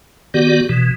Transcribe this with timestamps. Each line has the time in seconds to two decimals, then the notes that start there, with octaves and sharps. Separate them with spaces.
0.34 D#3 B3 F#4 G4 D5
0.69 B2 E3